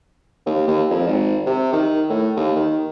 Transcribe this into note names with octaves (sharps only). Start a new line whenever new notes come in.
D#2
D#2
F2
G#1
C3
D#3
A2
D#2
D#3